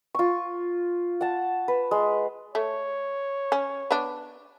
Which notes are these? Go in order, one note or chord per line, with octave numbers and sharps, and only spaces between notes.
F4 C#6
F#5 A5
B4
G#3
A3 C#5
C#4
B3 D4